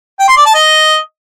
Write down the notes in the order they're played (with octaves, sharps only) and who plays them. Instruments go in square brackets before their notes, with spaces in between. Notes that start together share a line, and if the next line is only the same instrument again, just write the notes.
[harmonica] G5
C6
D5
A5
D#5